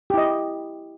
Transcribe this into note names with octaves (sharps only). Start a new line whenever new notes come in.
E4 G4 D#5